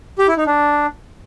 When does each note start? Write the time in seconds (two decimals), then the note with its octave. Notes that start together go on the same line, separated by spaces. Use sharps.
0.18 G4
0.28 E4
0.37 D#4
0.46 D4